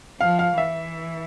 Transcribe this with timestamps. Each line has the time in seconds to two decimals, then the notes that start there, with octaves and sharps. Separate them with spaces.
0.20 F3 F5
0.39 F5
0.58 E3 E5